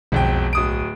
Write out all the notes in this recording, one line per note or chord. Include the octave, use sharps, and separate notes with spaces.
E1 B1 F2 G5
D1 D#6 D7